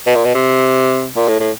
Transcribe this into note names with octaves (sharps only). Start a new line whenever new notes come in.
B2
A#2
B2
C3
A#2
A2
A2